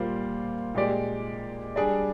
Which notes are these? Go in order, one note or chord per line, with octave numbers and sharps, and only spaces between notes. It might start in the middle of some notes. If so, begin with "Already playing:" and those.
Already playing: A#2 G3 A#3 F4 C5
A#2 G#3 D#4 G4 D5
G3 D4 G#4 D5